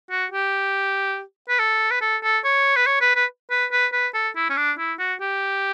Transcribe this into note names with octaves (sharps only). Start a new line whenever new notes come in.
F#4
G4
B4
A4
B4
A4
A4
C#5
B4
C#5
B4
B4
B4
B4
B4
A4
E4
C#4
D4
E4
F#4
G4